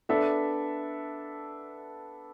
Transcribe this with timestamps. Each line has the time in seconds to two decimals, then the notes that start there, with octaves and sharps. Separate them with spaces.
0.09 B3 D4 A4 E5